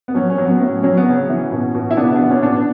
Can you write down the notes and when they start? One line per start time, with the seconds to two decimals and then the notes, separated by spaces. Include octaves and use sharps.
0.08 B3
0.15 F#3 C#4
0.30 C#4
0.38 F#3
0.45 B3
0.61 A2 C#4
0.83 F#3 C#4
0.97 B3
1.07 C#3 C#4
1.29 E3
1.52 B2
1.74 B2
1.91 E4
1.97 C#3 B3 D4
2.16 E3 B3
2.30 C#4
2.43 B2 B3 D4